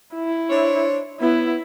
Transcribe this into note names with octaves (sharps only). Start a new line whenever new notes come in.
E4
D4 C5 C#5
B3 E4